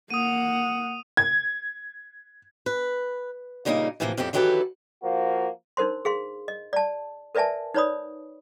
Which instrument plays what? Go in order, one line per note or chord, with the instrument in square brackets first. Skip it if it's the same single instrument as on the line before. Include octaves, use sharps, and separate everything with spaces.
[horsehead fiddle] A#3 F#5 [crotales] D#6 D#7
[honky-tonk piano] G#6
[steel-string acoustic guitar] B4
A#2 C#3 G3 A#3 C#4 D#4
A2 C3 E3 F3 A3 A#3
F2 A2 C4 G4 A4
D#3 E3 F#3 G4 A4 B4
[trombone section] F3 A#3 F#4
[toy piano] D4 D#4 A#4 C5 C6
G#4 F5 C6
D#5
D5 A5
A#4 B4 D5 E5 G#5 A5
D#4 B4 C#5 D5 B5 D#6